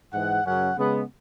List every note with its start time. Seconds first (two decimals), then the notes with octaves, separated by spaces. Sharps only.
0.13 G#2 E3 G#3 F#5
0.46 F#2 C#3 F#3 C#4 F#5
0.77 C#3 G#3 B3